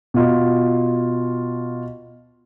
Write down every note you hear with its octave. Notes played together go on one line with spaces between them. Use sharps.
B2 F4